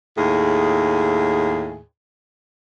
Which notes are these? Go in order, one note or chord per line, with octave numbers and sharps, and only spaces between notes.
D#2 A2 G#4